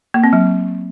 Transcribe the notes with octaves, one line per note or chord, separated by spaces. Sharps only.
A#3
C4
F#3